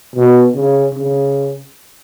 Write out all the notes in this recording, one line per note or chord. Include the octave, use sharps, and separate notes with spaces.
B2
C#3
C#3